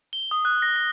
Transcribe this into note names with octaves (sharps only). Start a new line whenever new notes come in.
G7
D#6
F#6
A#6
A#6